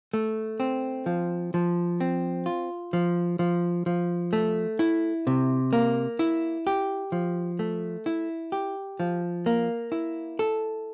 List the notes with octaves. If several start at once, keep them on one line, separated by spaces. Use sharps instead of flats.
A3
C4
F3
F3
C4
F4
F3
F3
F3
A3
E4
C3
A#3
E4
G4
F3
A3
E4
G4
F3
A#3
E4
A4